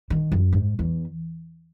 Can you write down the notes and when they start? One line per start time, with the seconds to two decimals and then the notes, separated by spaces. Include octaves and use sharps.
0.10 D#3
0.32 F#2
0.52 G#2
0.79 E2